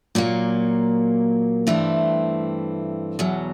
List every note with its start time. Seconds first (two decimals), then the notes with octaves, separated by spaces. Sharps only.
0.15 A#2 F#3 A#3
1.67 G2 E3 A3 C4
3.19 E2 B2 F#3